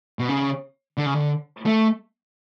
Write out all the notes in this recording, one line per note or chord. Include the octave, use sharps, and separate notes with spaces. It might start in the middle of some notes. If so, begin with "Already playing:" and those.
B2
C#3
D3
C#3
D3
A3